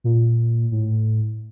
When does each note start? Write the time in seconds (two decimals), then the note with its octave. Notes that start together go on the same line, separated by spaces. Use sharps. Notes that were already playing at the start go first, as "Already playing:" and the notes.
0.04 A#2
0.71 A2